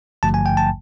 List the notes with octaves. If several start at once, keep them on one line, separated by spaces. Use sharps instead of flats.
G#1 G2 D3 F3 A3 A5
G#5
G5
A5